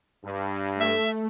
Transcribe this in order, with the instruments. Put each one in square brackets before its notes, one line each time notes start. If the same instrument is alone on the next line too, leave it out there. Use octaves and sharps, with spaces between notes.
[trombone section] G2
[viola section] A3 [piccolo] E5